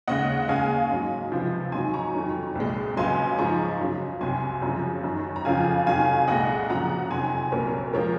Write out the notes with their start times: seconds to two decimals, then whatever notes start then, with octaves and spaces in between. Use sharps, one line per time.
0.07 D#2 C#3 G#3 D#5 F#5
0.48 D#2 C#3 G#3 F5 G#5
0.90 G#2 F#3
1.32 C#2 C3 F3
1.72 G#2 D#3 F#3 G#5 C6
1.94 A#5 C#6
2.15 F2 D#3 F#3
2.55 C2 A#2 G#3
2.97 C#2 C#3 F#3 G#5 C6
3.38 G#2 F3 G#3 A#5 C#6
3.80 F#2 C#3 F#3
4.21 C2 C3 F#3 G#5 C6
4.62 F#2 C#3 F3 G#3
5.03 F#2 D#3 F#3
5.36 A#5
5.45 F2 C#3 F3 F5 G#5
5.86 F2 C3 D#3 F#3 F5 G#5
6.28 C2 A#2 G#3 D#5 F#5
6.70 F#2 C#3 F3 F#5 A#5
7.10 F2 C3 D#3 F#3 G#5 C6
7.52 C2 A#2 F#3 A#4 C#5
7.93 F3 G#3 A#4 C#5